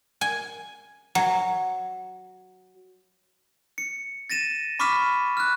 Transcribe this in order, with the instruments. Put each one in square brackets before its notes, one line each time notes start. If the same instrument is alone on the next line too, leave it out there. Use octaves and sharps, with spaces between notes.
[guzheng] G#5
F#3
[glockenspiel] C#7
A6 A#6 D#7 E7
B5 C#6 D6 F6 B6 E7
F6 F#6